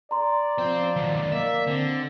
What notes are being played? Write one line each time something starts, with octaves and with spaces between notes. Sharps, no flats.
D5 A#5 C6
F3 C5 G5
D#3 F#3
A#3 D#5 E5
D3 C4